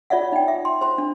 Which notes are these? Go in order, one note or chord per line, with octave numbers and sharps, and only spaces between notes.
F4 C#5 D5 E5 F#5
D#4 G5
E5
C6
C5 C6
D4